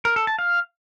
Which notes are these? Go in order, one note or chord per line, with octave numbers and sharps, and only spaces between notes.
A#4
A4
A5
F5